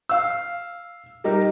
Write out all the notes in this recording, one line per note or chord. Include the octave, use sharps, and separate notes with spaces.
F5 E6
G3 D#4 G4 A#4